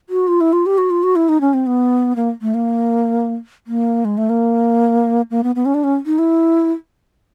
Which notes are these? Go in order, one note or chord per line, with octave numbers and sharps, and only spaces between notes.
F#4
F4
E4
F4
G4
F#4
F4
F#4
E4
D#4
C#4
C4
B3
A#3
A3
A#3
A#3
G#3
A3
A#3
A#3
B3
B3
C#4
D4
C#4
D#4
E4